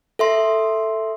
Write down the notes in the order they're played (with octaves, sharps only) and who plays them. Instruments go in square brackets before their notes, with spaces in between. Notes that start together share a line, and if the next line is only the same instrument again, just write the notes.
[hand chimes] A4 E5 C6